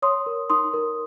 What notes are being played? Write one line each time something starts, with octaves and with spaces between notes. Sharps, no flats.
C#5 C6 D#6
A#4
D#4 C6 D#6
A#4